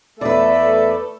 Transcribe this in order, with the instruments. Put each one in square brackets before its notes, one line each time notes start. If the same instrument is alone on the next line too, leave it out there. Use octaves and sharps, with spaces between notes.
[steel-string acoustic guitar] E2 B4 [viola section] A3 A4 [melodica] D5 [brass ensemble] E5